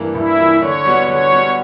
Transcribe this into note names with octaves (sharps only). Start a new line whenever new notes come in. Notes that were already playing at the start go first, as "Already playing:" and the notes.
Already playing: G2 E3 A#3
G2 E4
E3 A#3
D3 C#5
G3 B3 F#4
D3 C#5
G3 B3 F#4